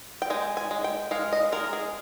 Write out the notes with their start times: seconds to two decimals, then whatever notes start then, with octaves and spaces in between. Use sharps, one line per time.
0.22 G5
0.30 G#3 G#5
0.57 G#5
0.71 G#3
0.84 G5
1.11 G#3 F5
1.33 D#5
1.52 G#3 A#4
1.73 G#4